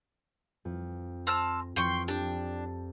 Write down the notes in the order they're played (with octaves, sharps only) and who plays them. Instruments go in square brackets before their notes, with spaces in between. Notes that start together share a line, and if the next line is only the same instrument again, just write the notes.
[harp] F2
[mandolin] C4 A5 F6
[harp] F2 F3 [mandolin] G5 C6 C#6
[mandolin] D4 [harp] G4